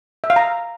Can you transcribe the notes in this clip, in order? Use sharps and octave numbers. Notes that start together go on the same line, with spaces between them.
E5
F5
A#5